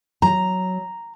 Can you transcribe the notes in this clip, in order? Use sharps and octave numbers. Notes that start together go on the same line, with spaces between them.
F#3 A#5